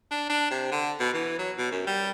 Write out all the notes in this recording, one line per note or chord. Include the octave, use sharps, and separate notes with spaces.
D4
D4
C3
D3
B2
E3
F#3
B2
F#2
G3